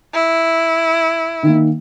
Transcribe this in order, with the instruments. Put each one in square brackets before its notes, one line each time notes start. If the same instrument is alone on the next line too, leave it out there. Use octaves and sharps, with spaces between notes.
[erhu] E4
[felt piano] D#3 A#3